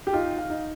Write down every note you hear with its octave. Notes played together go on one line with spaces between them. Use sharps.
G4
D#4 F4
F5
D#4